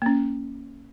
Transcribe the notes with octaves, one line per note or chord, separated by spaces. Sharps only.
A#3 C#4